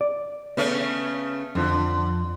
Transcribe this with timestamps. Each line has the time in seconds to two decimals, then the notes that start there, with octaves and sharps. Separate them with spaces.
0.01 D5
0.57 C#3 A3 B3 C#4
1.55 F2 D3 F3